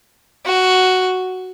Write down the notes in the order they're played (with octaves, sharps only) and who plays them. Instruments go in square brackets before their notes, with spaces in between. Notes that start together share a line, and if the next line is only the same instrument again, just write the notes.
[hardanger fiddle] F#4